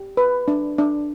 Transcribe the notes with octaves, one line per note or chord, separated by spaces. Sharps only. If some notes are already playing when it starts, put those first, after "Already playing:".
Already playing: G4
B4
D4
D4